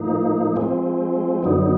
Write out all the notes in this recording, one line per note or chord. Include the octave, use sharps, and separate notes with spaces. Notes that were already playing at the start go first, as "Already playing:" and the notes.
Already playing: A2 F3 A#3 D#4
F3 G#3 C4
F#2 D3 F#3 B3 D#4